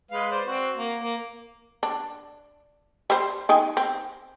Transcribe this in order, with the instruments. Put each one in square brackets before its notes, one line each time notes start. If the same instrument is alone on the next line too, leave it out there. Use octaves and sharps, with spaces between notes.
[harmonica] G#3 B4 F5
C5 D5
C4 F#4
A#3
A#3
[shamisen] D4
G3 C5
D#4 G5 G#5
C4